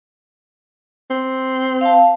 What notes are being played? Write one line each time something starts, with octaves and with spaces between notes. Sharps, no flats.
C4
F5 A5